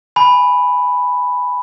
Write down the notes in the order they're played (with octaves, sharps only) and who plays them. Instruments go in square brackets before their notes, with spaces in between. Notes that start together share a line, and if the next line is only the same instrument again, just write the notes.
[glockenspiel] G#5 B5